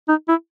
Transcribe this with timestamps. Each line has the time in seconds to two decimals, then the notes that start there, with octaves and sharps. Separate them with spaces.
0.08 D#4
0.28 E4